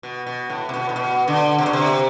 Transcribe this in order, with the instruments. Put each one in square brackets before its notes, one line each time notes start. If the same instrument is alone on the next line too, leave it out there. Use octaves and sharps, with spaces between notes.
[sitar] B2
B2
A2
C3
B2
A2
B2
D3
C3
B2
C3